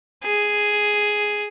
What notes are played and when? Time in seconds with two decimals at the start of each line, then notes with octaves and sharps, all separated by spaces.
0.25 G#4